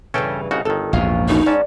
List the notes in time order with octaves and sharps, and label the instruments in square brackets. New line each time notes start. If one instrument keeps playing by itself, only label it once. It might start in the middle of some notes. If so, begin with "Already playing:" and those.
[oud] G2 C#3 E3 [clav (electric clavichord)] C#4 A4 G5
[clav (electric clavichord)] C2 C#3 F#4 [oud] D#4
[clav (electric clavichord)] G1 D#3 [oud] A4
[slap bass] A#1 E2 G#2 [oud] C#4 F4 F5
[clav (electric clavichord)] G1 F#2 B2 [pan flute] D#4
[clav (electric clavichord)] G#2 C#4 A5 [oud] D5